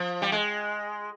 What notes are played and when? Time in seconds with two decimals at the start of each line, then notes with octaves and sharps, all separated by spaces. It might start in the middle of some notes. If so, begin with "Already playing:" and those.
Already playing: F3
0.22 G3
0.32 G#3